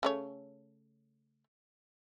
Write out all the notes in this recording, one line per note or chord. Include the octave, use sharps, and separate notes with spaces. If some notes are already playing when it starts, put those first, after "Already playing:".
C#3 A3 C#5